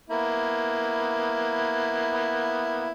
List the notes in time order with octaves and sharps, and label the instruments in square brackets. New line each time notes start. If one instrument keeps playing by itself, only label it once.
[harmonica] A#3 B3 E4